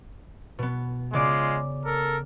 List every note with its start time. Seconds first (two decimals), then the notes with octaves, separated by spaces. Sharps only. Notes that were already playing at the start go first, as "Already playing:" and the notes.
0.59 B2 B3
1.13 C#3 G#3 F4 D5 D6
1.85 A4 A#4